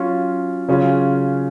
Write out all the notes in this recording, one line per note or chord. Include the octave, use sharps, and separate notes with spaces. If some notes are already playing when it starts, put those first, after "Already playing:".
Already playing: F#3 C#4 F4
C#3 F#3 C#4 F4